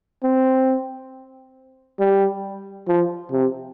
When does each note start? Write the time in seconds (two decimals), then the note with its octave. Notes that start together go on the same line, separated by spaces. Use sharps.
0.23 C4
2.00 G3
2.88 F3
3.32 C3